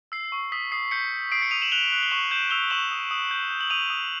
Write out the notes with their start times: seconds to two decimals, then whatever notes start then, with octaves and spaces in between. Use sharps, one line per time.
0.12 E6 C7
0.32 C#6
0.52 D#6 B6
0.72 D#6 C7
0.91 G6 B6 C#7
1.12 G6
1.32 D#6 C7 D7
1.42 B6 C#7
1.51 D#6 D#7 F7
1.62 E7 F#7
1.72 F#6 F7 G7
1.92 F#6
2.03 G7
2.11 C#6 E7 F#7
2.31 G6 E7 F#7
2.51 E6 F7 G7
2.70 C#6 E7 F#7
2.92 D#6
3.11 D#6
3.31 G6
3.51 G6
3.60 F#7
3.70 D#6 D#7 F7
3.90 D#6